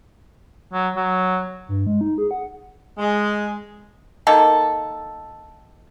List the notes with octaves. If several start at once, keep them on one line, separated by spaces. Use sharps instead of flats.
F#3
F#3
G2
G#3
D#4
G#4
F#5
G#3
D#3 A#3 A4